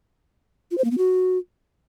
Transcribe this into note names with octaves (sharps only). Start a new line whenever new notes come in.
F4
C5
A#3
B3
F#4